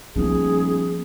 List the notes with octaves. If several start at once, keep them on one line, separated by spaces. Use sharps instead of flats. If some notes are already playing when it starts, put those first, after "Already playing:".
D#1 F3 B3 G#4